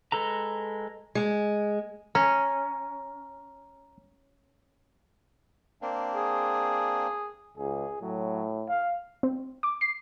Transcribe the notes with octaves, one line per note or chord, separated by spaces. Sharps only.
G#3 A4 B4 A#5
G#3
C#4 A#5
A#3 C4 D4
G#4
C#2 G#4
A2 F#3
F5
C4
D6
C7